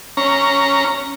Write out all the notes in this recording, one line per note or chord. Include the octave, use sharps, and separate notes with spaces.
C#4 A#5